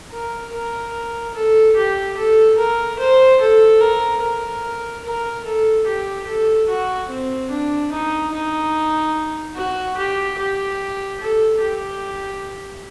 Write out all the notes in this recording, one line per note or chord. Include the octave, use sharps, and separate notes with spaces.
A#4
A#4
A4
G4
A4
A#4
C5
A4
A#4
A#4
A#4
A4
G4
A4
F#4
C4
D4
D#4
D#4
F#4
G4
G4
A4
G4